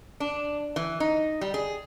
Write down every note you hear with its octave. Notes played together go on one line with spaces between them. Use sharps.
D4
E3
D#4
G3
G#4